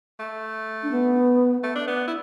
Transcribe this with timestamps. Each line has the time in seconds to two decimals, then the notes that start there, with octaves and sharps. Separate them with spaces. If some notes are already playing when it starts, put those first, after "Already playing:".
0.20 A3
0.83 D4
0.91 B3
1.63 A3
1.75 D4
1.88 B3
2.07 E4